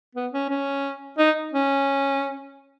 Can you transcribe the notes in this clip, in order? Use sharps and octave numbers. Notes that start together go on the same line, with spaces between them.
B3
C#4
C#4
D#4
C#4